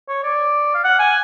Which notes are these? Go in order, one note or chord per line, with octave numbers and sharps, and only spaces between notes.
C#5
D5
F5
F#5
G#5